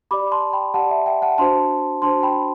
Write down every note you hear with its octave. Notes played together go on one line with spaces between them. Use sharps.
G4 D5 B5 D6
A5 C6
G5 B5
G4 D5 F#5 A5
E5
E5 G5
F#5 A5
D4 F#4 C5 A5 C6
D4 F#4 C5 A5 C6
G5 B5